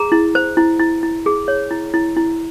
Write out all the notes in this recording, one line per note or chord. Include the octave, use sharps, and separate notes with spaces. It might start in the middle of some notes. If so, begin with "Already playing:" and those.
Already playing: G#4 A#5
E4
C5
E4
E4
E4
G#4
C#5
E4
E4
E4